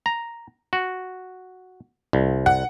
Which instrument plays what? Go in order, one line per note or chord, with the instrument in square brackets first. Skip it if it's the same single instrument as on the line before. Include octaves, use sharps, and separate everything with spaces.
[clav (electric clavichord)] A#5
F#4
C2
[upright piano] F#5